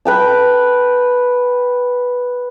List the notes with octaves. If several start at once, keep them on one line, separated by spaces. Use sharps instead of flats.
B4 G5 A5